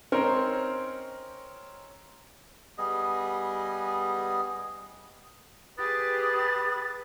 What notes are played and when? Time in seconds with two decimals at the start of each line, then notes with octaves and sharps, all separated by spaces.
0.12 C4 C#4 D#4 A#4 C5
2.78 G3 B3 G#4 D#5
5.78 G4 G#4 B4 D#6 A6